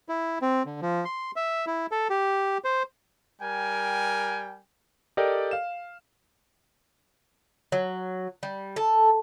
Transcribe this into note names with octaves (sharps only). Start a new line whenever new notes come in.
E4
C4
D3
F3
C6
E5
E4
A4
G4
C5
G3 A#4 G5 G#5
G4 A4 A#4 D5 D#5 G5
F5 E7
F#3
G3
A4